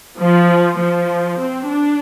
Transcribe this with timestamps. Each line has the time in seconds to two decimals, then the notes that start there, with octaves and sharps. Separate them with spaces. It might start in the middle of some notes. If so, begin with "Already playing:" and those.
0.19 F3
0.79 F3
1.40 C4
1.70 D4